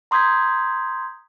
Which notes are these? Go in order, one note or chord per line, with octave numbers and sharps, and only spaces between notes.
A#5 C6 D#6 G6 G#6 B6